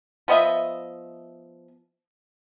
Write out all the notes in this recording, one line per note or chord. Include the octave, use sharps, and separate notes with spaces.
F3 B3 D#5 E5